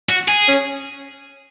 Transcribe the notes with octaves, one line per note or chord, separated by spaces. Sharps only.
F#4
G#4
C#4